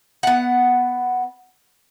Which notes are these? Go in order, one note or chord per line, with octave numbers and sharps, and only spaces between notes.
B3 F#5